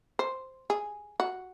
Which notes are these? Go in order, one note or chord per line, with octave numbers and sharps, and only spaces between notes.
C5
G#4
F#4